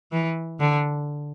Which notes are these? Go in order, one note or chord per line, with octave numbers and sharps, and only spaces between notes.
E3
D3